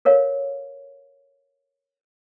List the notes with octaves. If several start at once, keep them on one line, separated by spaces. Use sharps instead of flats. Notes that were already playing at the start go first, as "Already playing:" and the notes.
A4 A#4 C#5 F5